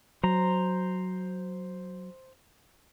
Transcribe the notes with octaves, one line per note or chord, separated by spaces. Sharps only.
F#3 C5 A#5